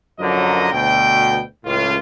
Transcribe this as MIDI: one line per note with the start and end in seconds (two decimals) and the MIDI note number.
0.19 0.70 42
0.19 0.70 50
0.19 0.70 53
0.19 0.70 54
0.19 0.70 70
0.19 0.70 75
0.72 1.41 38
0.72 1.41 47
0.72 1.41 79
1.65 1.96 37
1.65 1.96 45
1.65 1.96 65